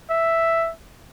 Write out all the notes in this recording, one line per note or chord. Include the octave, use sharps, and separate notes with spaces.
E5